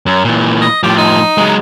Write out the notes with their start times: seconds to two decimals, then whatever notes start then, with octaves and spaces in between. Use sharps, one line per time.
0.06 F#2
0.25 A#2 E3
0.62 D#5
0.83 A2 F3 G4
0.98 D#4
1.38 F#3 G#3